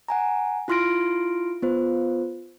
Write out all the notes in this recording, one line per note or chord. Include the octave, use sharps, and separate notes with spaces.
F#5 G#5 A#5
E4 F4 C6 F6 A#6 D7
B3 F4 C5